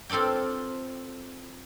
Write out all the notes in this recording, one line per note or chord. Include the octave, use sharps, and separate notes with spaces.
C4 F4 A4 D5 G5